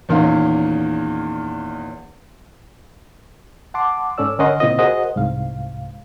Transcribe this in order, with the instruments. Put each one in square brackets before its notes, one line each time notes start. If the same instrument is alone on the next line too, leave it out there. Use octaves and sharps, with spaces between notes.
[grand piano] E2 A#2 D#3 C#4 F5
[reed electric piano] F#5 A5 C6 D6
G#2 C#4 A4 D5 E6
D3 C#4 A#4 D#5 F#5 C6
A#2 C#3 C4 E4 F4 D#5
F#4 G#4 A#4 C5 D#5 F#5
C2 G#2 F5